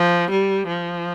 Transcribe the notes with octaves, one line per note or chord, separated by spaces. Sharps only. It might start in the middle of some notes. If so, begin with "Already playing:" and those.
Already playing: F3
G3
F3